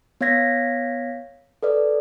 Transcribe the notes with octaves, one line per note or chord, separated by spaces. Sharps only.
B3 C#5 F5 G#6 A#6 B6
A4 B4 D5